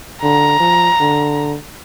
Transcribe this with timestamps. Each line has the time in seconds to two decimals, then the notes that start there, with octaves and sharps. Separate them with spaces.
0.23 D3 A#5
0.60 F3
1.01 D3